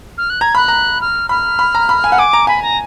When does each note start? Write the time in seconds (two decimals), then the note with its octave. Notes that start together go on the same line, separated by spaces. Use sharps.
0.18 F6
0.30 F#6
0.41 A#5 G#6
0.55 B5 F#6
0.68 A#5
1.01 F6
1.29 B5 F6
1.59 B5
1.75 A#5
1.89 B5
2.04 G#5
2.12 F#5
2.18 G#5 D6
2.33 A#5
2.47 G#5 B5
2.62 A#5